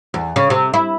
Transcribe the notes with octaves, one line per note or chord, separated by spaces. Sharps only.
E2
C#3
C3
E4